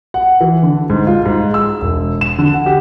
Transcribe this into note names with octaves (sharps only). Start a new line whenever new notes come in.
F#5
E3
D3
G#2
F4
G#2
E6
E1
E7
D3
F#5
G4